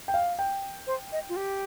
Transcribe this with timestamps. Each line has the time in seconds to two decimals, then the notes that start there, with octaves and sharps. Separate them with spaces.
0.08 G5
0.14 F5
0.39 G5
0.87 C5
1.12 D#5
1.29 F4
1.36 G4